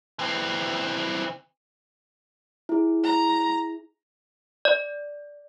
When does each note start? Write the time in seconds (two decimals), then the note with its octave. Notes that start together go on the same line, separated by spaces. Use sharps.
0.19 E3 C4
2.69 E4 G#4
3.04 A#5
4.65 D5